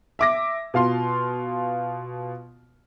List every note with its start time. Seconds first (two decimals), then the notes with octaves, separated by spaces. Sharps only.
0.19 E5 D6 A#6
0.74 B2 F4 F5 C6